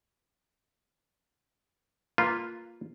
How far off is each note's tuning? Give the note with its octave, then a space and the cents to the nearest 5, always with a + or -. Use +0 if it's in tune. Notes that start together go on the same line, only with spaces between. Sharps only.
A#3 -10 F4 +0 B4 +0